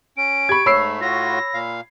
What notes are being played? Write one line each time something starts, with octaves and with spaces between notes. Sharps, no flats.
C#4 D7
G4 B5 C#6 G#6
G#2 A3 C#5 B5 E6 C7
A2 F4 F#4 A#6
A#2 F5